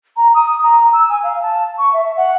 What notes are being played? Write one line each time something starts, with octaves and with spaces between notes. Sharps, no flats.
A#5
D#6
A#5
E6
G#5
F5
A5
C#6
E5
F#5